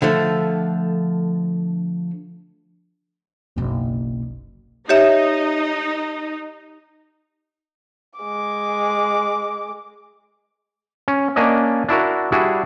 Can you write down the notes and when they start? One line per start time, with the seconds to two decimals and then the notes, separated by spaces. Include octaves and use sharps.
0.02 D3 F3 A3
3.56 F#1 B1
4.89 D#4 G4 C#5 E5
8.20 G#3 D6
11.08 C#4
11.36 A#3 C#4 D4 D5 D#5
11.89 D4 E4 F#4 A#4
12.32 G3 D4 E4 F#4 G#4